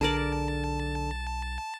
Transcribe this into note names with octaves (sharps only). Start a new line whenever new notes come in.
B1 D3 G#4 A#4 D5 A5